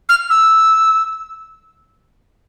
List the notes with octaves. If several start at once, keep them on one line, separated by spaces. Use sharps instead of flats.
F6
E6